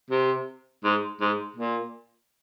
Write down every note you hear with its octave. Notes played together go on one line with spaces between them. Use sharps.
C3
G#2
G#2
A#2